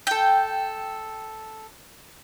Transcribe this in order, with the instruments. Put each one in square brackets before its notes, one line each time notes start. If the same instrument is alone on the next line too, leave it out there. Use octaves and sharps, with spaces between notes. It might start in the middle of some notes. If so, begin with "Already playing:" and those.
[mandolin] A4 G5